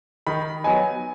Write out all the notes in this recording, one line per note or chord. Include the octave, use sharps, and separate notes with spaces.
D#3 B5
F#3 B3 D#4 G#5